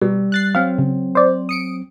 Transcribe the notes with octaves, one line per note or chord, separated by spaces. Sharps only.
B2 G3
F#6 A6 C7
F#3 C4 F5
C#3
C5 D5
D#6 C#7 D7